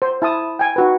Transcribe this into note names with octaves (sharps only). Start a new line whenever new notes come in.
C5
E4 A5 D#6
G5 G#5
D#4 F#4 B4